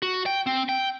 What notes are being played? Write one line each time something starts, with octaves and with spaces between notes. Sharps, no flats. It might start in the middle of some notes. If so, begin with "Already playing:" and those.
F#4
G5
C4
G5